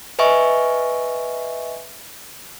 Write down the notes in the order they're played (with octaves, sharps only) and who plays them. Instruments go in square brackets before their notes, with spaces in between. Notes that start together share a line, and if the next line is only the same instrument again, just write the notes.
[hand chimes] B4 D#5 E5 G#5 C#6